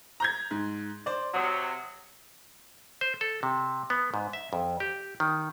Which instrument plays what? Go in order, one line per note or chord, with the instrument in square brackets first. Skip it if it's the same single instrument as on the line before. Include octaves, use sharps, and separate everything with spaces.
[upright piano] A#5 G6 G#6
G#2
C5 D5
[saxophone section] C3 F#3 [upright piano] D#6
[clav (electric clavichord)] C5
A4
C3
B3
G#2
E5
F2
G4
D#3